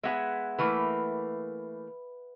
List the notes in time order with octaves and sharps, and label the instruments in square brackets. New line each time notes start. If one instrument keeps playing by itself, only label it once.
[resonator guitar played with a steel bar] G#3 B3 [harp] E5 F#5 G#5
[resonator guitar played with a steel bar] E3 A3 A#3 [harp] B4